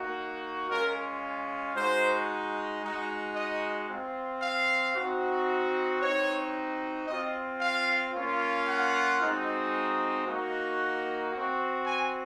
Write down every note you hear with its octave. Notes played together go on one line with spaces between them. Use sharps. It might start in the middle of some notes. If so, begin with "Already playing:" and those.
Already playing: A#3 D#4 F#4
G#3 C#4 F4 A#4
G#3 D#4 F#4 C5
G#3 D#4 F#4
D#5
C4 F4
F5
C4 D#4 F#4
C4 D#4 F#4 C#5
C4 F4 D#5
F5
A#3 C#4 F4
F#5
G#3 C4 D#4 F#4
A#3 D#4 F#4
C4 F#4
G#5